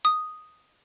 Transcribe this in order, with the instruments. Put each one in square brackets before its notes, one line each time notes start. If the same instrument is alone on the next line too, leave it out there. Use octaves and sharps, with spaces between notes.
[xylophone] D#6